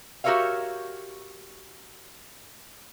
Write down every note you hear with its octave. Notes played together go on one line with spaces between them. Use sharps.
F#4 G4 A#4 C#5 E5 F5